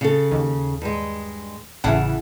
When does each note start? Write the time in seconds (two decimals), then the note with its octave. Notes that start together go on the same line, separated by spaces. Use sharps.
0.01 C#3 A4
0.31 D#2
0.82 G2 G#3
1.84 A1 C#3 E3 E4 F#5 A5